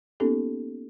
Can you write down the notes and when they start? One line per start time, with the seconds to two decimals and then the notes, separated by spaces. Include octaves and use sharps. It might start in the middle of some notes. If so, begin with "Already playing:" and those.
0.20 A#3 B3 C#4 D#4 G4 A4